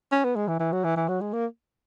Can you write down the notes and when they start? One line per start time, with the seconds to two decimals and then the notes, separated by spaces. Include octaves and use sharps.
0.12 C#4
0.24 B3
0.36 G#3
0.48 E3
0.60 E3
0.72 F#3
0.84 E3
0.96 E3
1.08 F#3
1.21 G#3
1.33 A#3